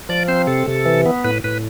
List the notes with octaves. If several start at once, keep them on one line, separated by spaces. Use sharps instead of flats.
F3 D5
C4 C5
C3 A4
C3
E3
B3
A2 B4
A2 B4